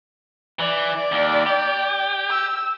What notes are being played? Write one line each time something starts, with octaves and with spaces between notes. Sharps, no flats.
E3 D5
D#2
G4
E6